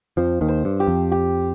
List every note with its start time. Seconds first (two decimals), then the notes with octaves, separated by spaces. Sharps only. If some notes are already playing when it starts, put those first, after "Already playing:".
0.17 F2 F3 C5
0.41 D#2 D#3
0.48 C5
0.65 G2
0.80 G4
0.87 F2
1.12 G4